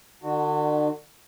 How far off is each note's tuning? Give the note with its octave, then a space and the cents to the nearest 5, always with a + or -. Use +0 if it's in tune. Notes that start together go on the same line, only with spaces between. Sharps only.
D3 +45 D4 +40 F#4 +0